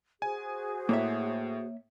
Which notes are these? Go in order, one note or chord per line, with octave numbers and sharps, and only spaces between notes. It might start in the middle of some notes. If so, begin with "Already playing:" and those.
F#4 G#4 C5 G#5
A2 A#3 C#5 E5